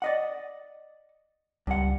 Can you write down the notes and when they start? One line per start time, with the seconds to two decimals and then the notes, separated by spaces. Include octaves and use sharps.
0.02 D5 D#5 F#5
1.67 C#2 G2 F#5